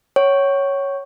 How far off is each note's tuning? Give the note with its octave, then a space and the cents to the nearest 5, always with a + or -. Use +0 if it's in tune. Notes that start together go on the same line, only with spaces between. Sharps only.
C#5 +0 F#5 +40